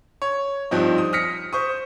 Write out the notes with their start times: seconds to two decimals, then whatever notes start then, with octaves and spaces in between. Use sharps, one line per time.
0.22 C#5
0.71 G2 F3 C4 D#4
0.98 D#6
1.13 D#6 F6 A#6 B6 C#7
1.53 C5 C#6 D#6